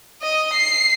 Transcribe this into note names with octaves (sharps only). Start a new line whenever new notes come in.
D#5
C7